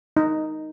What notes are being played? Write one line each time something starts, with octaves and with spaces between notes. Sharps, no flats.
D#4